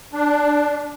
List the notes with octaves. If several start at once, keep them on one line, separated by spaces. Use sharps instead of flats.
D4